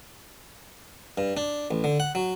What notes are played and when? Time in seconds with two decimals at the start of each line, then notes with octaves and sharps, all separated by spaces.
1.18 G2
1.37 D4
1.71 A1
1.84 D3
2.00 F#5
2.15 F#3